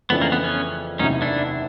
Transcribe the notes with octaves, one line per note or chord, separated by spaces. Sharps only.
F2 C#3 E3 A3 B3 D4
A#3
B3
B3 C#4
F#1 E2 C3 D#3 C#4 D#4
D4 E4